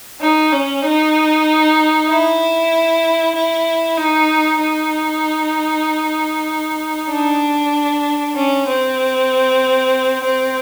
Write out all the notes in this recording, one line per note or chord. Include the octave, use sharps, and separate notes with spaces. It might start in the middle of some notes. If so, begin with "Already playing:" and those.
D#4
C#4
D#4
E4
E4
D#4
D#4
D4
C#4
C4
C4